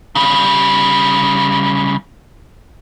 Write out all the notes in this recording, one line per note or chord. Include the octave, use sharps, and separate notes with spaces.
C#3 G3